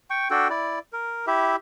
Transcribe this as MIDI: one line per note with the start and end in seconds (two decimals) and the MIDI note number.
0.10 0.28 79
0.10 0.28 85
0.31 0.48 62
0.31 0.48 66
0.31 0.48 69
0.31 0.48 79
0.50 0.79 64
0.50 0.79 74
0.93 1.26 70
1.27 1.56 64
1.27 1.56 67
1.27 1.56 76